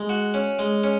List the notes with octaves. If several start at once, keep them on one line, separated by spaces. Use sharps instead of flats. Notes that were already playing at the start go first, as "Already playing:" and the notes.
Already playing: G#3
F#4
C#4
G#3
C#4